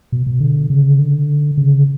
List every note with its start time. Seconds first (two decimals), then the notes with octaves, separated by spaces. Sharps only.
0.12 B2
0.27 B2
0.40 D3
0.70 C#3
0.99 D3
1.57 C#3